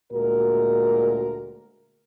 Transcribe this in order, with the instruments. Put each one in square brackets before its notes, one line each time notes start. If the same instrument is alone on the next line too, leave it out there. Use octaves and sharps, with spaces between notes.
[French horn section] D2 A#2 G#3 F#4 A#4